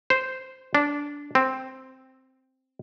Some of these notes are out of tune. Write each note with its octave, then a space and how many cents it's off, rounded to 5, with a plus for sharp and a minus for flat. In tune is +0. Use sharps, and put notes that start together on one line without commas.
C5 -5
D4 -15
C4 +0